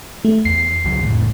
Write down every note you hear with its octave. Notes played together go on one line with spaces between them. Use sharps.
A3
E2 C7
C#2 D#3 F#3
F1 C#2 A2